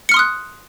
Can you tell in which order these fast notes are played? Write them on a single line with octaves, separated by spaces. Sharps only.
C#7 F6 C6 D#6 F#6